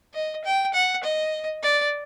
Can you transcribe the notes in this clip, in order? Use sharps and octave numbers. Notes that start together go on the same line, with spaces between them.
D#5
G5
F#5
D#5
D5